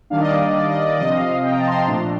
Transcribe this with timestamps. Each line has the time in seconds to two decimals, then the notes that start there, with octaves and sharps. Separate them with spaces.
0.10 D#3 G3 A#3 D4 F5
0.21 D#5
0.25 D5
0.40 D#5
0.55 D5
0.70 D#5
0.84 D5
0.99 C3 F3 C4 D#5
1.13 F5
1.29 F5
1.44 G5
1.51 A#5
1.58 A5
1.67 C6
1.73 A#5
1.87 A#2 F3 A3 D4